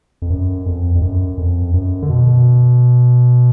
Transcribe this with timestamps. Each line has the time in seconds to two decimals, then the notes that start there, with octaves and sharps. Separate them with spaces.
0.22 F2
0.30 F#2
0.66 F2
0.95 F2
1.01 F#2
1.38 F2
1.74 F#2
2.03 D3
2.09 B2